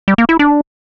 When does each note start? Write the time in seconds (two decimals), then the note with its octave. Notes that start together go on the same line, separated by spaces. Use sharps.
0.08 G3
0.18 A#3
0.29 E4
0.39 D4